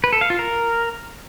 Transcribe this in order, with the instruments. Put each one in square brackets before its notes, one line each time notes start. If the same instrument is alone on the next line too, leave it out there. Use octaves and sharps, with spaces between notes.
[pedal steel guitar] B4
A4
F5
F4
A#4